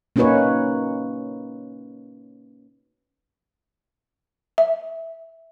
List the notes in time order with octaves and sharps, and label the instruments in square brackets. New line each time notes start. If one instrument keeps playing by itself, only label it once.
[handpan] A#3 C#4 D#4 F#4 B4 C#5
[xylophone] E5